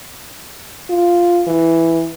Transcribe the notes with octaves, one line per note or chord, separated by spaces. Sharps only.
F4
E3